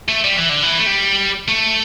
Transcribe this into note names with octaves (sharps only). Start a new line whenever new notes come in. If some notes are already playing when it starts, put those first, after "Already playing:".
A3
G3
E3
D3
E3
A3
G3
A3